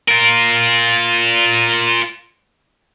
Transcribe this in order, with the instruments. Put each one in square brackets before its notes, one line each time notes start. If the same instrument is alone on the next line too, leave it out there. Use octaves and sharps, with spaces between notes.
[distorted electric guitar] F4 A#4